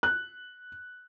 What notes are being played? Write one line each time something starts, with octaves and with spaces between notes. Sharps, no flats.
F#6